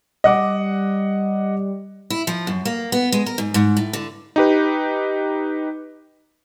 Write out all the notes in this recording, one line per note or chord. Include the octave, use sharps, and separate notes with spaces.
G3 D#5 F#5 D6
E4
F3
F#2
A#3
B3
G#3
A#4
G#2
G#2
A2
D3
D#4 G4 B4